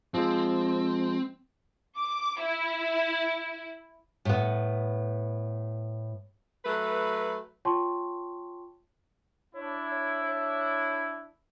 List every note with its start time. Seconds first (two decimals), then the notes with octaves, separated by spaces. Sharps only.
0.14 F3 G#3 C4
1.97 D6
2.40 E4
4.25 A2 B3
6.65 F#3 A3 B4
7.65 F4 C#5 G5 A5 C6 C#6
9.55 D4 E4 C#5
9.90 C#5
10.24 C#5